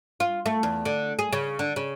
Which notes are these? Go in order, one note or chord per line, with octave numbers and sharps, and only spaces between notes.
F4
A3
E2
D3
G#4
C#3
D3
C#3